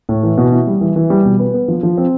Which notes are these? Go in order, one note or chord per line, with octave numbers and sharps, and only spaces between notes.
A2
E3
B2
E4
G3
E3
E3
G3
B2
B4
B3
F3
F3
C4